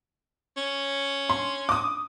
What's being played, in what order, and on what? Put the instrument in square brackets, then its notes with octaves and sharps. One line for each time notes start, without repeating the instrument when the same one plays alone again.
[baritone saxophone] C#4
[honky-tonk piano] C6
D6 D#6